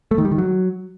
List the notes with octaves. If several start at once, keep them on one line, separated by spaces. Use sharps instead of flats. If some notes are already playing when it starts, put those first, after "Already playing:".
A3
D#3
G3
D#3
F#3